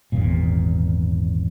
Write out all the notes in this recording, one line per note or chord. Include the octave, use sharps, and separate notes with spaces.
G#1 E2 A#2